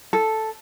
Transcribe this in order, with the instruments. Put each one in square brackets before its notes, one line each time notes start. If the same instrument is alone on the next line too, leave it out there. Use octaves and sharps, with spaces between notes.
[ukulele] A4